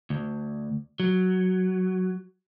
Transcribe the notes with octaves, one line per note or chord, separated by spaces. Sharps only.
D2
F#3